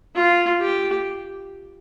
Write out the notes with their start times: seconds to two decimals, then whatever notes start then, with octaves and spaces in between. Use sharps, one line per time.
0.15 F4
0.61 G4